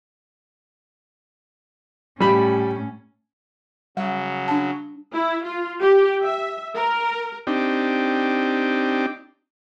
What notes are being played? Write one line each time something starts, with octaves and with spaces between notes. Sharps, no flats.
A2 G3 C#4 B5
C#3 F#3 G3 F#5
D4 A5
E4
F4
G4
E5
A#4
C4 D4 D#4 G4